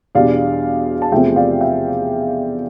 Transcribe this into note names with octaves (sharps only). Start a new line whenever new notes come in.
E2 B2 G3 D4 D5 F5
A5
E2 C3 F3 A3 C4 E5 G5
D5 F5
E5 G5